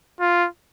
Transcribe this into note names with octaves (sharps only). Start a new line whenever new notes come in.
F4